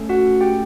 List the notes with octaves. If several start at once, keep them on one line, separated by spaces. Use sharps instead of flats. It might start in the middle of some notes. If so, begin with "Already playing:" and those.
Already playing: A3 C#4 A4
F#4 F#5
G4 G5